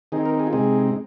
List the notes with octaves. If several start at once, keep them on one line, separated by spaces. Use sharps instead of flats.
D#3 C4 D#4 G#4
A#4
G#4
F4
C3 G#3 C4 D#4 G#4